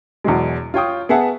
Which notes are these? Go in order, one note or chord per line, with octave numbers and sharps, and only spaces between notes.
E2 B2 F#3 G#3
F4 C#5 G5 D#6
B3 G#4 E5 F#5 A5